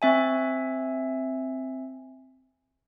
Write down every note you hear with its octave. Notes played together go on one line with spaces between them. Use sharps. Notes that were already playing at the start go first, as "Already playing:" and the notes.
C4 E5 G#5